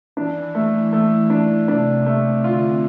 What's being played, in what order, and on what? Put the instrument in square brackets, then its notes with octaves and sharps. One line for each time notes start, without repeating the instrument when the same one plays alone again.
[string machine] E3 [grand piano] D4
[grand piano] A3
A3
D4
[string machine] C3 [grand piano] D4
[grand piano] A3
[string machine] D3 [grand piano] F4